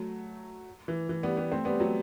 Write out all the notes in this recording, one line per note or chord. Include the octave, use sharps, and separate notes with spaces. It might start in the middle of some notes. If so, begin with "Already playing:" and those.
Already playing: F#3 A3
E3
E3
G3 B3
G3 B3
A3 C4
G3 B3
F#3 A3